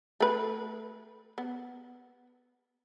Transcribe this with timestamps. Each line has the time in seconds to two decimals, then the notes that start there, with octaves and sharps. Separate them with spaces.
0.20 A3 B4
1.38 B3